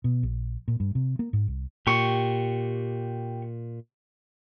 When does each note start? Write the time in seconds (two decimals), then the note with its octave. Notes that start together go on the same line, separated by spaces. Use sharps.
0.04 B2
0.23 A#1
0.68 A#2
0.80 G2
0.95 C3
1.19 A#3
1.33 G#2
1.48 C2
1.87 A#2 G4 C#6